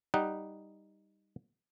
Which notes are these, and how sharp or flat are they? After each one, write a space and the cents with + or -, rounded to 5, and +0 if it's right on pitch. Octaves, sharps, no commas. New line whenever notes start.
G3 +0 D#4 +0 F#5 +0